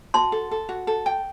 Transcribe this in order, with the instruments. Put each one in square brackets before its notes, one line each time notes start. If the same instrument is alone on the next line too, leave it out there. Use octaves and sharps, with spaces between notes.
[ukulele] F#4 [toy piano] A5 C6
[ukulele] A4
A4
F#4
A4
G5